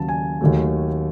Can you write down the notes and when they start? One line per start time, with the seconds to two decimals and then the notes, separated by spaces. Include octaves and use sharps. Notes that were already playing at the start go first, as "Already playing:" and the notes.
Already playing: D#2 C#3 F#3 A5
0.09 G#5
0.41 D#2 D#3 F#3 A3